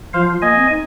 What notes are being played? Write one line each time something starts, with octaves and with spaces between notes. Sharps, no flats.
F3 C5 F5
A#3 D#5 G#5
C4
D#4